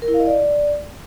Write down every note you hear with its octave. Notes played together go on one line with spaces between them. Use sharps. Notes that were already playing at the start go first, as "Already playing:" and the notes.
A#4
E4
F5
D#5
D5